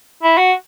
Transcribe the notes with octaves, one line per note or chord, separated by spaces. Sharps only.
E4
F#4